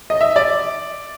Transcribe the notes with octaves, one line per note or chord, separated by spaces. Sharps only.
D#5
E5
D5